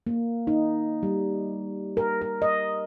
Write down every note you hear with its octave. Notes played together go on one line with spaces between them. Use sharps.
A#3
D#4
G3
A#4
A#4
D#5